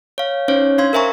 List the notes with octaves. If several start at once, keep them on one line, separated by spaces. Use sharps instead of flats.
C#5 F5
C#4 D#4 C5 C#5
D4 F5 C6 G#6
A#4 C5 E5 G#5 A#5 C#6